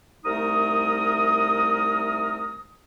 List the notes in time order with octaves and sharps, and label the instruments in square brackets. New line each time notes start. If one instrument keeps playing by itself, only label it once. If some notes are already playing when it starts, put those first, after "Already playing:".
[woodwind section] C2 A3 D#4 A#4 D#6